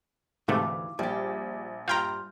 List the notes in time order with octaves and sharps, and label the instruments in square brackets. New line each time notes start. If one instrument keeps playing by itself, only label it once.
[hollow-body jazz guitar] D2 E3 [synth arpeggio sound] G#2 C3 A3 [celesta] F5 D6
[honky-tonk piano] A#1 [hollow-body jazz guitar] G3 G4
[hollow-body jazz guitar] G2 [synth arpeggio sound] F4 G5 A#5 [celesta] C6 F6 G6